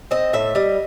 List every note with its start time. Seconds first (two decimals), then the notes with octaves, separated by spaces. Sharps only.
0.11 C4 D#5
0.33 A2 E5
0.55 G3 D#5